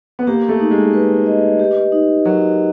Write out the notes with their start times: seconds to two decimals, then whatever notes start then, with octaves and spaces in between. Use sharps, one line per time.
0.19 B3
0.27 A#3 G4
0.49 A3
0.60 D#4
0.71 G#3
0.93 B4
1.26 D#5
1.59 G4
1.92 D#4
2.25 F#3 A#4